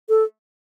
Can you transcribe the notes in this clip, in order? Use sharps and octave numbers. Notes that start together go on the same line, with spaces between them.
A4